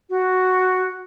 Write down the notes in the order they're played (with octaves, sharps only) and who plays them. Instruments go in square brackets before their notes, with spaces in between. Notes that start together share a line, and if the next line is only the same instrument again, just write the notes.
[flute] F#4